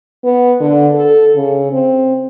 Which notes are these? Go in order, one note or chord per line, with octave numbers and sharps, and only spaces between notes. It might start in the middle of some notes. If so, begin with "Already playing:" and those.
B3
D3
A4
C#3
C4